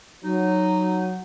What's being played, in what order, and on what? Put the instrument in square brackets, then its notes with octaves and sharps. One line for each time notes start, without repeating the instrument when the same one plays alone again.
[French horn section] F#3 [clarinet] D#4